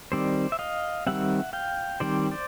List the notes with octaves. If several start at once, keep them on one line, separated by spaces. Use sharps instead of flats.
D#3 G3 C4 C5 D5
E5
D#5 F5
D#3 G3 C4 E5 F#5
F5 G5
D#3 G3 C4 C5 D5
C5 D5